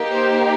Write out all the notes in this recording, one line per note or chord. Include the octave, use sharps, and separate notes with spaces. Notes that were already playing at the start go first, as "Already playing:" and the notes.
Already playing: A#3 D#4 G4
C5